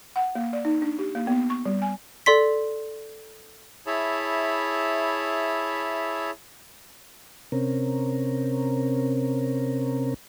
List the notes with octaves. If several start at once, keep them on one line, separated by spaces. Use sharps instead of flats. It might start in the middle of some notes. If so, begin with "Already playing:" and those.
F#5
A#3
D5
D#4
D4
G4
A#3
B3
C#6
G3
G#5
A4 D5 C6 B6
E4 G#4 C#5 E5 A5 B5
C3 C4 C#4 A#4